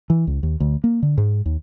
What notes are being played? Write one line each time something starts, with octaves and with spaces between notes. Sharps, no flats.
E3
C#2
D#2
D2
A#3
D3
G#2
D#2